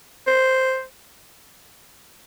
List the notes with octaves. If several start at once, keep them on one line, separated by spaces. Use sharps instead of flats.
C5